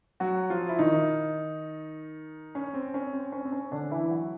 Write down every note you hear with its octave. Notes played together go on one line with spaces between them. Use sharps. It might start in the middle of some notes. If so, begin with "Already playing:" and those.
F#3 F#4
F3 F4
E4
D#3 D#4
C#4
C4
C#4
C4
C#4
C4
C#4
D3 D4
E3 E4
F#3 F#4